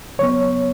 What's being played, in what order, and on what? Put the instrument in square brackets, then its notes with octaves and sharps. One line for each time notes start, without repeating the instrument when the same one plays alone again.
[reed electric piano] C#3 F#3 B3 C#5